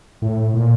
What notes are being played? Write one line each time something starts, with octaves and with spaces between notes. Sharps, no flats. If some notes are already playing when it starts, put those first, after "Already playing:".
A2
A#2